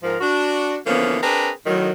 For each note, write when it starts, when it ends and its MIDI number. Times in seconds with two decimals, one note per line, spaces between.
0.03 0.16 44
0.03 0.16 53
0.03 0.16 70
0.21 0.77 62
0.21 0.77 66
0.86 1.17 50
0.86 1.17 52
0.86 1.17 53
0.86 1.17 58
0.86 1.17 59
0.86 1.17 61
1.23 1.50 60
1.23 1.50 62
1.23 1.50 68
1.23 1.50 70
1.23 1.50 71
1.66 1.90 45
1.66 1.90 51
1.66 1.90 54